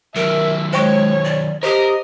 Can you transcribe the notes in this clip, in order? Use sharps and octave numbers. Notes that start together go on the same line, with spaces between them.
D#3 F#3 A#4 E5
G#3 C5 C#5 G5 C#6
D5
G4 A#4 C5 D#5 D#6